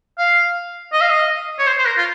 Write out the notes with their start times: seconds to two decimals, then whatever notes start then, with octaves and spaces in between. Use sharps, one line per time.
0.18 F5
0.93 D#5
1.01 F5
1.10 D#5
1.59 C#5
1.66 C5
1.78 C5
1.86 A#4
1.97 F4